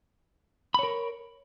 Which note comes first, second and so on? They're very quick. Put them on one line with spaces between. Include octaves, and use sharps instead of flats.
B5 C#5 A#4